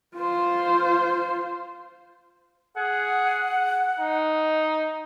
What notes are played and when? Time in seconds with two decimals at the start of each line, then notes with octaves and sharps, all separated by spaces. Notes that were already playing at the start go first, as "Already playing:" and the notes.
0.17 F4 C5
2.77 G#4 F#5
4.00 D#4